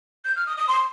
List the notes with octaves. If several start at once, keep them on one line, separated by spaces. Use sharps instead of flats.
G6
F6
D#6
D#6
C6